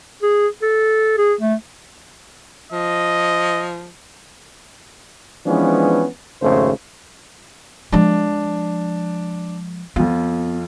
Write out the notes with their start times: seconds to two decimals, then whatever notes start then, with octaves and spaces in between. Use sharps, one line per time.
0.22 G#4
0.62 A4
1.18 G#4
1.41 A3
2.72 F3 D#5
5.46 E3 F3 G#3 B3 C#4 D4
6.42 G#1 F2 C#3 A3 C5
7.92 F3 G#3 D4
9.96 F2 B3 F4